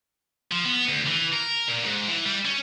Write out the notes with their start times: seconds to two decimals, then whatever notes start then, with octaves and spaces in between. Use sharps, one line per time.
0.51 F3
0.65 B3
0.88 D2
1.07 E3
1.33 A#4
1.68 A#2
1.85 G#2
2.08 E3
2.25 G3
2.45 C#4